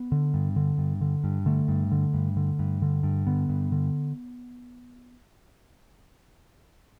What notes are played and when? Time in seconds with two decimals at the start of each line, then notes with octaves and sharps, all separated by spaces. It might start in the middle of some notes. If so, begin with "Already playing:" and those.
Already playing: B3
0.12 D3
0.34 G2
0.56 D3
0.78 G2
1.01 D3
1.24 G2
1.46 D3 A3
1.68 G2
1.92 D3
2.14 G2
2.37 D3
2.59 G2
2.82 D3
3.03 G2
3.27 D3 B3
3.49 G2
3.72 D3